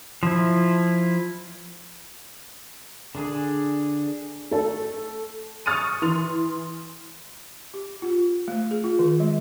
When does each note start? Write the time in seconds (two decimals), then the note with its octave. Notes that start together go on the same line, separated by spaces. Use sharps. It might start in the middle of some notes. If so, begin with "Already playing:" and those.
0.23 F3 E4
3.15 D3 D4 G#4
4.51 A3 A4
5.66 C#6 D#6 F6 A6 C#7 D#7
6.02 E3 C6 F7
7.74 G4
8.02 F4
8.48 A3
8.71 G#4
8.84 F4
8.99 D#3
9.20 G#3